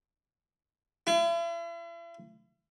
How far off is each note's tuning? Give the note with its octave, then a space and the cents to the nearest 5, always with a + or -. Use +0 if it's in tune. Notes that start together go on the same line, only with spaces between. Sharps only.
E4 +45